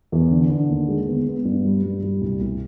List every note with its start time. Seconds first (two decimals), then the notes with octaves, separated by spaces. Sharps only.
0.12 E2
0.31 D3
0.50 D3
0.69 D#2
0.88 G#3
1.07 B3
1.27 B3
1.45 G2
1.64 G3
1.83 G2
2.03 G3
2.21 C2
2.41 C2